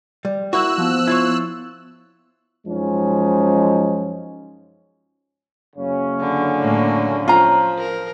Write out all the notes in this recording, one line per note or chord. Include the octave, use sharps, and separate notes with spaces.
G3
A#3 E4 F#4 E6 F#6
F3 B3
E4 F4 C#5
F#2 F3 G#3 C#4 D#4
F#1 C#3 C#4
D3
A2 A#3
F3 F4 A#5
A#4